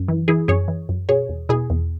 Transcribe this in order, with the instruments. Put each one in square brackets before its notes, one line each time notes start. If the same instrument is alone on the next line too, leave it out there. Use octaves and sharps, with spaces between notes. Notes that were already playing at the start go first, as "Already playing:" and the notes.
Already playing: [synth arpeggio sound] F#2
E3
E3 E4 G#4
F#2 G#4 C#5
E3
F#2
B2 G#4 C#5
E2
B2 E4 G#4
E2